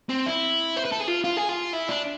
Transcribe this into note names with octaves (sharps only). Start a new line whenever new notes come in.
C4
E4
C5
B4
A4
G#4
F4
F4
G#4
F4
E4
D4